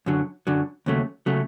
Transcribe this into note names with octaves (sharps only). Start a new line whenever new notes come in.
F#2 D3 F#3
F#2 D3 F#3
D#2 C#3 F#3 A3
C#3 F#3 A3